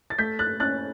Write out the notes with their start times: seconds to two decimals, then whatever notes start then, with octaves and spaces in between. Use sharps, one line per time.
0.10 A6
0.18 A3 G6 B6
0.39 F#6 A6
0.60 C#4 F#6 A6